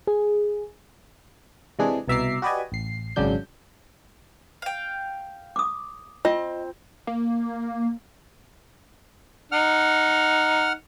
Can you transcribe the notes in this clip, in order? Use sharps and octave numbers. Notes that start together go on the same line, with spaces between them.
G#4
C3 E3 G#3 D4 G#4
C2 B2 E5 A#5 D6 C7
F#4 G4 B4 D5 D#5 G#5
A1 C7
G#1 F#2 C#3 F#3 D4 G6
F5 G5
D6 D#6
C4 F4 D#5
A#3
D#4 F#5 F6